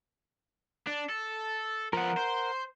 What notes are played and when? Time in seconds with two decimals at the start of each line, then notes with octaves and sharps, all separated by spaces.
0.87 D4
1.09 A4
1.93 F3 B3 A#4 F#5
2.17 C5